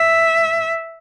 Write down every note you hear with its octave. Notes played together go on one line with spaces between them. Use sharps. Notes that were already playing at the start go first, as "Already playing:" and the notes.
Already playing: E5